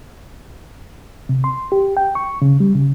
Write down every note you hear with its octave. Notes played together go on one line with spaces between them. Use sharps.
C3
C6
G4
G5
C#6
C#3
G3
C#3